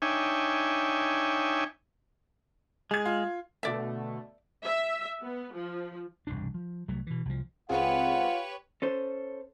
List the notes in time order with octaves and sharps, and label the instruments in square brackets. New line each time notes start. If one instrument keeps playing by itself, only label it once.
[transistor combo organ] D4 D#4 C#5 E5 G5 G#5
[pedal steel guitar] G#3 [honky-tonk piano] G#4 G#6
[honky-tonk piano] F4
[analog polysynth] B2 D3 A3 [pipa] D5 E5
[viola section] E5
B3
F3
[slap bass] E1 C2 G2 D4
F3
C2 F#3 A3
B2 E3
C2 F3
[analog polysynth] C#2 C4 G#4 [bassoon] F4 [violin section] G4 B4 C#5 [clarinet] F#5
[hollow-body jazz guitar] C#4 A4 C5